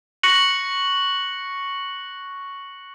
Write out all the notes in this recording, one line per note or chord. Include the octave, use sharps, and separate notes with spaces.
C#6 F#6 A#6 C#7 F#7